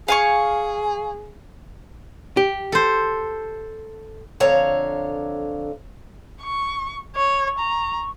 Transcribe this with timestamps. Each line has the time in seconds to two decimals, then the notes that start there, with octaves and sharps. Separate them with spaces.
0.08 G#4 F5 G#5 C#6
2.37 G4
2.72 A4 C5
4.40 F2 D3 C#5 F5 A#5
6.42 C#6
7.16 C#5 C#6
7.59 A#5